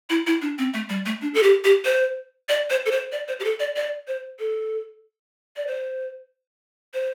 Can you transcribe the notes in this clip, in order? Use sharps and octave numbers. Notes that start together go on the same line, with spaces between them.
E4
E4
D4
C4
A3
G3
A3
D4
A4
G4
G4
C5
D5
C5
A4
C5
D5
C5
G4
A4
D5
D5
C5
A4
D5
C5
C5